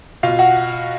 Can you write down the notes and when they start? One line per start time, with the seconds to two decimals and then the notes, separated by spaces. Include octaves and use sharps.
0.23 B2 F4 F5
0.39 F#4 F#5